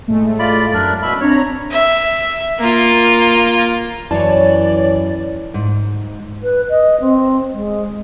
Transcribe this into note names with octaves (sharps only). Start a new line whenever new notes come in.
A2 G#3 A3
F4 D5 B5
F#2 D4 A#4
B2 E5 B5
C4 D4 C#5 A#5
E5
A#3 F4
F#2 E3 C#5 D5 A5
G#2
B4
D#5
C4
G#3